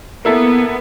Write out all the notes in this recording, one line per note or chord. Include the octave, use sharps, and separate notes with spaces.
A#3 B3 E4 A4